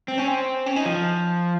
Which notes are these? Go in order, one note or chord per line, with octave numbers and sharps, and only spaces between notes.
C4
C#4
C4
C#4
D#4
F3